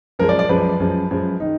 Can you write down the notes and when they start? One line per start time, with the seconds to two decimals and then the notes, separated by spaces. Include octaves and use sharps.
0.19 F#2 F3 G#3 A#4
0.29 D5
0.39 D5
0.49 F#2 F3 G#3 B4
0.80 F#2 F3 G#3
1.11 F#2 F3 G#3
1.40 D#3 D#4